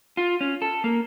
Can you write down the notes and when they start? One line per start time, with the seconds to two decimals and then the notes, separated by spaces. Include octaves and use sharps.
0.17 F4
0.41 C#4
0.62 A4
0.84 A#3